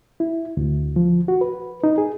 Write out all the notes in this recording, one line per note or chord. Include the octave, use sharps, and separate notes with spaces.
E4
D2
F3
F#4
B4
D#4
G#4